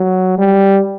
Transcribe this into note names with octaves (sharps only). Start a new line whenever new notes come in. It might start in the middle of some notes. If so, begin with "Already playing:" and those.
Already playing: F#3
G3